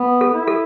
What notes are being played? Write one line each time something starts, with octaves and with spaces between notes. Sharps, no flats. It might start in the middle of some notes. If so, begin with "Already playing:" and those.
Already playing: B3
A4
E4
A4